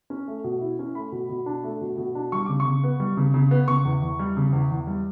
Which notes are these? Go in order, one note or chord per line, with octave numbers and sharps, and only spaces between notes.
C#4
A3
B2
E4
C#4
A3 B5
B2
B2
D4
A3
B2
B2
D4
G3 C#6
C#3 D6
C#6
C#3
B3
G3
C#3
C#3
B3
C#3 C#6
E2
E2
G3
C#3
E2
E2
G3